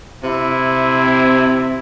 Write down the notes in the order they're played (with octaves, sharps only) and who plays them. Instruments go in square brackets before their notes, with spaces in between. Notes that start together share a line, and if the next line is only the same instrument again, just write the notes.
[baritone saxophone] C3 [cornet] E4